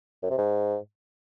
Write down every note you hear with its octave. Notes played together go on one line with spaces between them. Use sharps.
F#2
C3
G#2